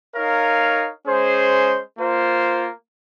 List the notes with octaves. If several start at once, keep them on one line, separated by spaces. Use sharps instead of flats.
D#4 A#4 C#5 F5
G#3 C#4 G#4 C5
A#3 F4 C5